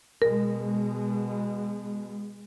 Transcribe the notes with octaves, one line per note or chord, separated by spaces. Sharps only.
B2 G#3 A#4